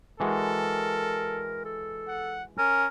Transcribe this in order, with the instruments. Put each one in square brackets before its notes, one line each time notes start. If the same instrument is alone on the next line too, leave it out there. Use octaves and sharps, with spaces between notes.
[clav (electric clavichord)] E3 G#3 F#4 [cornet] A4 [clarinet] A#4
[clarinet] A4
[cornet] F#5
[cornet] C#4 [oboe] A#4 [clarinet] G#5